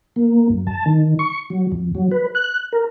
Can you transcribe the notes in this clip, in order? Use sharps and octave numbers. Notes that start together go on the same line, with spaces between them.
A#3
F#2
A5
D#3
C#6
F#3
F2
F#3
B4
F#6
A#4